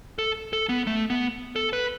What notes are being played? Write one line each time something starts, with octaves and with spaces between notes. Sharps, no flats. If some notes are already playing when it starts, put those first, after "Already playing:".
A4
A4
B3
A3
B3
A4
B4